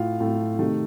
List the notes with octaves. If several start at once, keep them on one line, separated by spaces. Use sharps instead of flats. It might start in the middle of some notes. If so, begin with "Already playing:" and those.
Already playing: A2 A3 F4 F5
A2 A3
C3 D#3 A3